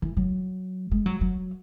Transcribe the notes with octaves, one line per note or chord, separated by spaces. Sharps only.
E3
F#3
G#3
F#3
F#3